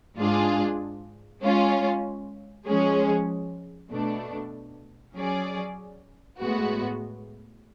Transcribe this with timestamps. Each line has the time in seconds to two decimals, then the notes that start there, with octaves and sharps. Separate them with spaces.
0.16 G#2 G#3 D4 F4 G#4
1.41 G#3 C#4 F4
2.65 F3 G#3 C#4 G#4
3.91 B2 A3 D4
5.15 F#3 C#4 G#4 D5
6.39 A2 G#3 B3 F#4